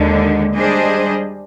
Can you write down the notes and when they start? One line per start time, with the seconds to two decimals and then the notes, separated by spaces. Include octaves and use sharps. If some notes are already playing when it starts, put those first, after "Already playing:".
Already playing: D#2 D3 G#3
0.54 G3 D4 G#4 C5 D#5